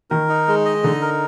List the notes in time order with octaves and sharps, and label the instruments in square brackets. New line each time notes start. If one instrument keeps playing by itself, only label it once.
[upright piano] D#3 [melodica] A#4
[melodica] D#4
G#3
D#5
[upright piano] D3 [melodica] D#4
[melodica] A#4